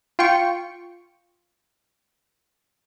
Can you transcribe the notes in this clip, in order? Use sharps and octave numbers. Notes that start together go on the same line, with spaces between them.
F4 G5 C#6